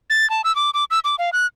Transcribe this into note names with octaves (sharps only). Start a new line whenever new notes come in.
A6
A5
E6
D6
D6
E6
D6
F5
F#6